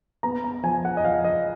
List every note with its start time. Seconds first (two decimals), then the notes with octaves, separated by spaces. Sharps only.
0.23 B3 A#5
0.44 A#5
0.63 F3 G#5
0.85 F#5
0.97 D#5
1.04 F3 F5
1.25 D#5